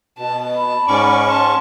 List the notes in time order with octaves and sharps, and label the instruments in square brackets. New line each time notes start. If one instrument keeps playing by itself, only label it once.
[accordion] B2 [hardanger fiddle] A5
[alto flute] B5
[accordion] G#2 C#4 C#6 [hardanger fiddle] D5
[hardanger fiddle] A5 [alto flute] C6